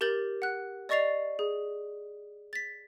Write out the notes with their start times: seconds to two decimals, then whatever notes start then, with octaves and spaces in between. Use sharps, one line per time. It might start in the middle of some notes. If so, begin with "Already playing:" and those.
0.01 G4 A#4 G6 A6 F#7
0.42 F#5 F#6
0.89 D5 D#5 C#6 A6 C7 F7
1.39 G#4
2.53 A6 B6